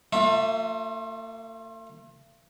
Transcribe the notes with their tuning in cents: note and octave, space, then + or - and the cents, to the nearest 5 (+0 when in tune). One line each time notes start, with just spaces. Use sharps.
A3 +45 F4 +35 E5 +0